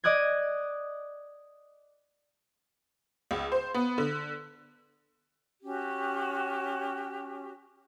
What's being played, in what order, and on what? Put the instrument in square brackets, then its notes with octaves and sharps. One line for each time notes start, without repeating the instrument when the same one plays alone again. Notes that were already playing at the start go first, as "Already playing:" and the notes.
[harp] D5 D#5 D#6 F#6 G#6
[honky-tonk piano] C#2
C5
B3
D3
[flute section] C#4 F#4 G4